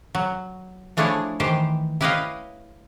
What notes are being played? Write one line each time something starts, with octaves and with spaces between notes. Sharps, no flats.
F#3
F3 A3 D4 E4 G#4 C#5
D#3 E3 G4 C5
E4 G4 B4 C#5 D#5 F5